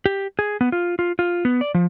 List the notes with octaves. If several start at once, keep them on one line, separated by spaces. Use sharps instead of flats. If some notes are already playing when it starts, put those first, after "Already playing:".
G4
G#4
B3
F4
F4
F4
B3
D5
F3